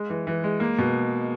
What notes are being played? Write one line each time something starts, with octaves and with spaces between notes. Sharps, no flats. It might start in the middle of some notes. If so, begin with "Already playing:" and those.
Already playing: G#3
E3
E3
G#3
A#3
B2